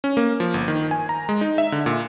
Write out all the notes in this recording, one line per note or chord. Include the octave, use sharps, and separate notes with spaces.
C#4
A#3
F3
G1
D#3
G#5
A#5
G#3
D#4
E5
D3
A#2